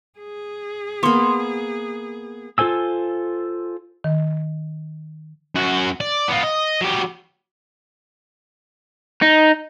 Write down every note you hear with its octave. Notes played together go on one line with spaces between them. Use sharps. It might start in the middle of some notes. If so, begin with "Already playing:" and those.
G#4
A#3 B3 C6
F4 A4 C5 G#5 E6
D#3
F#2 F#4
D5
B3 F4
D#5
F#3 G4
D#4